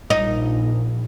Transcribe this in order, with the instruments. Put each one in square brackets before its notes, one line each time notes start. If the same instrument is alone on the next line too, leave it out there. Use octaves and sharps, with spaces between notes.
[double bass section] A#1 [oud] D#4